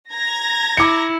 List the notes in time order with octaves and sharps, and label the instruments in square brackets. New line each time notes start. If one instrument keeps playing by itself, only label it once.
[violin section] A#5 G#6 A#6
[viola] E4 [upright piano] D6 C#7